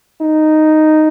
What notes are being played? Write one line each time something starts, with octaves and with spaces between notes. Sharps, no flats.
D#4